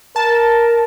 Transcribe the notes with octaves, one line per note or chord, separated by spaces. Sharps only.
A#4 A5